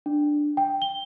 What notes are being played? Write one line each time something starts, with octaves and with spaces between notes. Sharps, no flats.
D4
G5
G7